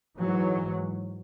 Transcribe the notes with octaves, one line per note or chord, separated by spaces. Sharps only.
G#2 E3 F#3